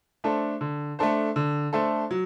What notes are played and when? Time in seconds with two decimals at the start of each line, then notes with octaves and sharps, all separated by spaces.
0.24 A3 D4 A4 C5
0.61 D3
0.99 A3 D4 A4 C5
1.36 D3
1.73 A3 D4 A4 C5
2.11 F#3